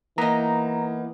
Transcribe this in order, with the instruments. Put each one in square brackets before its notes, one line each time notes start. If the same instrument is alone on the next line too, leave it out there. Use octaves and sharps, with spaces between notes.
[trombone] E3 [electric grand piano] A#3 [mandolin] B3 D#4 [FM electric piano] A#5